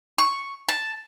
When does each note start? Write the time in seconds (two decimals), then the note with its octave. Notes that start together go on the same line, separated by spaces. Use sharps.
0.18 C#6
0.69 A5